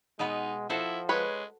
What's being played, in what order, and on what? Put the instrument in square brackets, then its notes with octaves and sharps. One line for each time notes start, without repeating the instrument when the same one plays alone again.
[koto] B2 B3 B4 [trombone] G#3 [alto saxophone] D#4
[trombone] F3 [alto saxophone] E4 [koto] F#4 A4 C5
[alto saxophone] G#3 [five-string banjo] B4 C#5